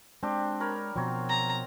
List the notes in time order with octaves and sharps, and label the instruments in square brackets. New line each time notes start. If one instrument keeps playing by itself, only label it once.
[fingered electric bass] G#3 [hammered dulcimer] C4 D4 G4
[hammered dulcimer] A#4 C#5 B5
[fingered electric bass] B2 F3 [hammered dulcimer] F#3 C4 C#5
[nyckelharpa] A#5